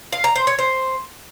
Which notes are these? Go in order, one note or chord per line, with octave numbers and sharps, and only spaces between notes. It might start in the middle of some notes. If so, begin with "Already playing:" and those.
F5
A#5
C5
C#5
C5